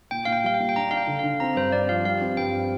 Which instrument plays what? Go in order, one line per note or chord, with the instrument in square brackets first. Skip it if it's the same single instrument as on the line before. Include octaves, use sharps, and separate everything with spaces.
[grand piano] A#2 [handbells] G5
[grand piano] A#2 [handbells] F5
[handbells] G5
[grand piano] G3 [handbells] F5
[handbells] G5
[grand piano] A#2
[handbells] G5
[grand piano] D4 [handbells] A#5
[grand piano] D4 [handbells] F5
[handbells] G5
[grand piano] D3
[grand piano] D3 [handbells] F5
[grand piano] C4 [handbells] A#5
[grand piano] G2 [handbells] C5
[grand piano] C4 [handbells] D5
[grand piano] F3 [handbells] F5
[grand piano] G3 [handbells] F5
[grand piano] C4
[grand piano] G2 [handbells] G5
[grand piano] C4